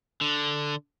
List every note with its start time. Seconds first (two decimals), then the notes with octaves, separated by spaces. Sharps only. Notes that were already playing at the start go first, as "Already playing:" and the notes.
0.21 D3